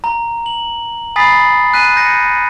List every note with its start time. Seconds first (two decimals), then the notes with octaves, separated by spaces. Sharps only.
0.04 A#5
0.46 F#7
1.16 G#5 B5 D#6 A6 B6 C7
1.73 G#5 F#6 B6 D#7
1.96 G6 A#6 C#7